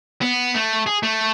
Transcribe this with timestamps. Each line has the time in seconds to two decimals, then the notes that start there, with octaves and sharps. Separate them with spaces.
0.21 B3
0.55 A3
0.87 G#4
1.03 A3